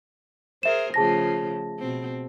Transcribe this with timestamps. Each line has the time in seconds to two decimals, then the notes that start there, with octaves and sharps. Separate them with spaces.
0.63 G#4 A#4 C5 E5 E7
0.94 C#3 F3 A3 G#4 A5 A#6
1.79 B2 C4